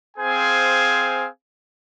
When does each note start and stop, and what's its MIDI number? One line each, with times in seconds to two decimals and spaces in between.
0.17 1.27 60
0.17 1.27 68
0.17 1.27 72
0.17 1.27 77
0.17 1.27 80